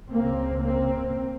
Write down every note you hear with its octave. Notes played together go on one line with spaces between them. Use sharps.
C#2 C#3 A#3 C4
A#3 C4